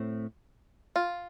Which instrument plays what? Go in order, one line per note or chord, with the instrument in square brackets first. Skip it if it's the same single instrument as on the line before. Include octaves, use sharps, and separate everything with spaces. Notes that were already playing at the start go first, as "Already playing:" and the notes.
Already playing: [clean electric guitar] A2 A3 C4
[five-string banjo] F4